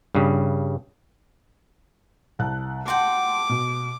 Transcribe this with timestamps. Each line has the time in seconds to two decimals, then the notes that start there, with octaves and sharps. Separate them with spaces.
0.15 G2 C#3
2.39 C2 A5 F#6
2.88 F#4 F#5 G5 A5 C6 D6
3.49 B2